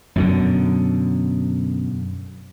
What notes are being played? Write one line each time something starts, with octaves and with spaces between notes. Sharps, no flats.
F#2 B2 D3